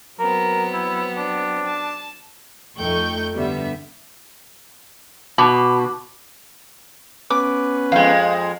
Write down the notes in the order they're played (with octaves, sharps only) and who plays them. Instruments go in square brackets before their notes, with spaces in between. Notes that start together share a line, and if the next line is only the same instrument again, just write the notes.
[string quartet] F#3 B3 C4 [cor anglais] A#4
[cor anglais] E4
D4
[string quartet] A5
[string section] F2 A3 D#4 G5 C#6 G6
G2 D3 G3 B3 E5
[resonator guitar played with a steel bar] B2 [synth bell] A5 D6
[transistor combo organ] B3 C#4 B4 [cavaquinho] D6
[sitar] F2 G#3 [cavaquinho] F5 G5